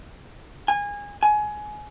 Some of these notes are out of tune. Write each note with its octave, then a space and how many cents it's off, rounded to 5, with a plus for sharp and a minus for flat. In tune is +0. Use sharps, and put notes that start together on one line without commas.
G#5 -25
G#5 +20